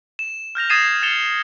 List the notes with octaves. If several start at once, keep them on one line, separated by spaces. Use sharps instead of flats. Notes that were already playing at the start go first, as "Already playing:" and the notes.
E7
F6 G6 A#6 F7
D#6 G#6 A6 C7 D#7 E7
F6 A6 C#7 E7 F7 G7